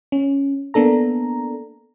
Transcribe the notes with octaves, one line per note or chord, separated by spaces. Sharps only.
C#4
A#3 B3 D4 A4 A#5